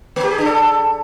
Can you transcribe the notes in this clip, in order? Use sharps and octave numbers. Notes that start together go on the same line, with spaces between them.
A3
G4
G#4
D4
A4